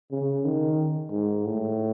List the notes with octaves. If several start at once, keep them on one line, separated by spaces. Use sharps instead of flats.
C#3
D#3
G#2
A2